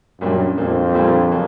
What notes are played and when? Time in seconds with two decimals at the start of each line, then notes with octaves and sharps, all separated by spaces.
0.20 F#2 A#2 G3 A#3 D4
0.57 F2 A#2 G3 A#3 D4
0.94 A#2 G3 A#3 D4
1.31 C#3 F#3 A#3